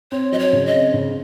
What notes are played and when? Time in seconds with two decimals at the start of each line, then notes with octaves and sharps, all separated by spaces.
0.12 C4 C#5
0.32 F#3 D#5
0.39 C#5
0.53 C#3
0.66 D#5
0.73 C4
0.94 C#3